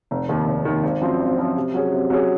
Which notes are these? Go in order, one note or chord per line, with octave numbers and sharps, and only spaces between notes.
F1
D#2 D#3
F1
D#2 D#3
G#1
F#2 F3 C4 F4
G#1
F#2 F3 C4 F4
C3
F#3 C#4 G#4
C3
F#3 C#4 G#4